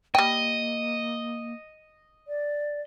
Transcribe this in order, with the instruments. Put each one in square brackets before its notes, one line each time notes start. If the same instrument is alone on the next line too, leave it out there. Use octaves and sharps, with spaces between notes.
[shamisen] G3 G5 [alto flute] A#3 [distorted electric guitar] D#5
[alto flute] D5